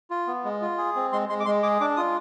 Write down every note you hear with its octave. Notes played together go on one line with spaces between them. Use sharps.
F4
B3
G#3
F4
G#4
C4
G#3 C6
G#3 C6
D6
G#3 C6
G#4 D6
D4 D6
F4 D#6